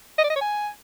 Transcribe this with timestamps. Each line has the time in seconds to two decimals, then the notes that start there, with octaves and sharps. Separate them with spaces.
0.18 D#5
0.24 D5
0.30 D#5
0.35 C#5
0.41 G#5